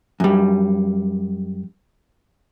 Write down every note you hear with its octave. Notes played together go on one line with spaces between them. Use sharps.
F#2 G3